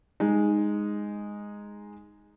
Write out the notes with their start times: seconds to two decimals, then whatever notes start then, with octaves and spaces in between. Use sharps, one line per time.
0.20 G#3 D#4